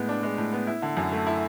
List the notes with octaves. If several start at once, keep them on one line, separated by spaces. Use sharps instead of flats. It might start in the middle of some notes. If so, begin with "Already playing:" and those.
Already playing: A2 G#3 B3
D4
G#3
A2
B3
E4
D3
F#2
A3
E4